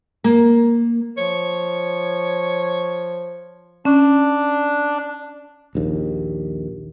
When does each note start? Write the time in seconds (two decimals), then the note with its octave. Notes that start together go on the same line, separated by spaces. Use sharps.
0.24 A#3
1.18 F3 C#5
3.85 C#4 D4
5.75 A#1 D#2